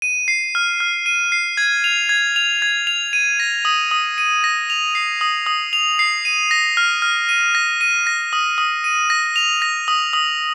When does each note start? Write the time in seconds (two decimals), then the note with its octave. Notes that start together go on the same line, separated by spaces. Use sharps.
0.02 D#7
0.28 C7
0.55 F6
0.80 F6
1.06 D#7
1.32 C7
1.57 G#6
1.84 F7
2.09 G#6
2.36 F7
2.62 G#6
2.87 F7
3.13 D#7
3.40 A#6
3.65 D#6
3.91 D#6
4.18 D#7
4.44 A#6
4.70 F7
4.95 C7
5.21 D#6
5.46 D#6
5.73 F7
5.99 C7
6.25 D#7
6.51 A#6
6.77 F6
7.02 F6
7.29 D#7
7.55 A#6
7.81 D#7
8.07 A#6
8.33 D#6
8.58 D#6
8.84 D#7
9.10 A#6
9.36 F7
9.62 A#6
9.88 D#6
10.13 D#6